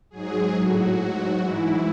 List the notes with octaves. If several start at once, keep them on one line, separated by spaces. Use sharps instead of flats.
G#2 F#3 G#4
A2 F#3 F#4
G#2 F#3 F#4
G#2 E3 E4